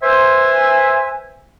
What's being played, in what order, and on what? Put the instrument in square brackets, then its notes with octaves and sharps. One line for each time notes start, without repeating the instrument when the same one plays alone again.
[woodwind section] B4 C5 E5 G#5